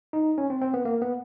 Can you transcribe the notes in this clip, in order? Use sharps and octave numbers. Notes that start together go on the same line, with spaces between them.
D#4
C#4
C4
C4
B3
A#3
B3